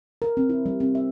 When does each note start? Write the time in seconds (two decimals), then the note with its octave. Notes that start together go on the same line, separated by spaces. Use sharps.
0.22 A#4
0.37 C4
0.50 E4
0.66 G3
0.80 C4
0.95 E5